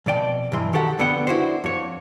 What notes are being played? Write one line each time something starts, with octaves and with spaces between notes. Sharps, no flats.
F2 B2 D5 G5
B1 G2 E3 C6
D#3 F#4 G4 A4 F#5
F2 D3 B3 F#5 G5
D4 E4 F#4 G4 C5
F2 C#5